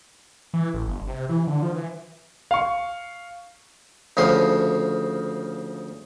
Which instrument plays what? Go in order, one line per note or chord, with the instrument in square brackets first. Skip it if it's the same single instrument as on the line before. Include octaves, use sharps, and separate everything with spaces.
[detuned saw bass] E3
A1
G1
C3
E3
D3
F3
E3
[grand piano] F5 C#6
[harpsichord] D2 C#3 F3 C6 D#6